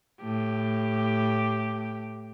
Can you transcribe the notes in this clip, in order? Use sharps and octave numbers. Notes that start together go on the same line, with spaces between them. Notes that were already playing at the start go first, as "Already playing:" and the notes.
A2 G4